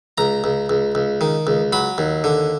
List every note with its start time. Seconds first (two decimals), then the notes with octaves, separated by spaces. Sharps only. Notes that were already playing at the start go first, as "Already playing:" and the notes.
0.18 C#2 A#5
0.44 C#2
0.70 C#2
0.95 C#2
1.21 D#3
1.47 C#2
1.73 F#3 B5
1.98 D#2
2.24 D3